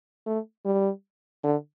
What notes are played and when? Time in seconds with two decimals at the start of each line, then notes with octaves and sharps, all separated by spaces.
0.27 A3
0.65 G3
1.43 D3